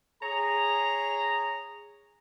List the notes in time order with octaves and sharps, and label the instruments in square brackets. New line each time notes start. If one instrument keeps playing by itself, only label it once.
[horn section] G#4 C#5 A#5